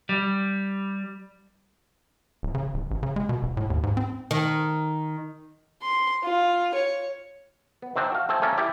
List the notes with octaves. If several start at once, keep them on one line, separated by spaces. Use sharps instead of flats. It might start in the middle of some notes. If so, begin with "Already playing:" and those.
G3
D1
C#3
D1
A1
C#3
G#3
B2
D#1
A2
D#2
G#2
C4
D#3
C6
F4
C#5
B3
D#3 C4 D4
F#4 F5
A3 C4 G#4 A4
A3 A#3 C#4 A4 D5
E4 G4 A4 D5 E5